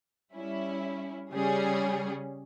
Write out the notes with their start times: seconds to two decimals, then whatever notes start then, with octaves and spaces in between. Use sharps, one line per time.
0.35 G3 C#4 E4
1.31 C#3 G3 C#4 G#4